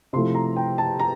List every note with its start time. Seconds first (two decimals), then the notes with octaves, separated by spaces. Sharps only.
0.13 C3 F3 A3 E4 C6
0.35 A#5
0.56 G5
0.78 A5
1.00 A#5